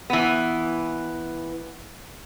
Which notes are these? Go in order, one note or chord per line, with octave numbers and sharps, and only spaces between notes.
E3 B3